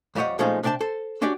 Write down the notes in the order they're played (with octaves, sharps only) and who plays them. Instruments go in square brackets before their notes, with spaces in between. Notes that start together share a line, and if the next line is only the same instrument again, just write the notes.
[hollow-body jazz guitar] F2 G3 G4 C#5 D#5 F#5
A#2 F3 G#3 A3 C#4 D#4
C3 D4 D5 G5 A5
A4 C5
C#4 D4 F#4 G4 D5